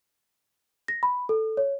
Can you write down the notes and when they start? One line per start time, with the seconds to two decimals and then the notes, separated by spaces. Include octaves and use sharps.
0.88 A#6
1.03 B5
1.29 A4
1.57 C#5